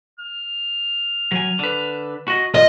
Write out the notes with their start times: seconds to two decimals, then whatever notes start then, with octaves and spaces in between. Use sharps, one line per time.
0.19 F6
1.32 F#3 G#5
1.59 D3 B4
2.28 F#4 D#5
2.55 F4 D#5